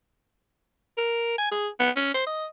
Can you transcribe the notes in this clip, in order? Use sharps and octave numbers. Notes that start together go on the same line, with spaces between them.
A#4
G#5
G#4
B3
C#4
C5
D#5